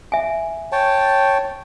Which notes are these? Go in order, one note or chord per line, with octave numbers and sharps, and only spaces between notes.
E5 G#5
C#5 G5 A5